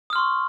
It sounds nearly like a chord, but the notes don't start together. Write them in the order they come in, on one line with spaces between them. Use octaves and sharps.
D#6 F6 C6 C#6